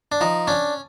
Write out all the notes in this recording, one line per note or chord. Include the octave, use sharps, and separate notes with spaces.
D4
F3 D#4
C#4 D4